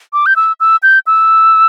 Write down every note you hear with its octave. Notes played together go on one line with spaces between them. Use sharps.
D6
G6
E6
E6
G6
E6